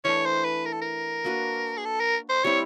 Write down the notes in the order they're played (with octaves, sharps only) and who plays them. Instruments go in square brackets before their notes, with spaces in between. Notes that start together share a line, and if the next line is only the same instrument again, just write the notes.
[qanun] E3 A3 D4 [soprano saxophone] C#5
[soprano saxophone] C5
B4
A#4
A4
A#4
[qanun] A#3 D4 F#4 B4
[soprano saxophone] G#4
A4
A#4
C5
[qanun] G3 C4 E4 [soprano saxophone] C#5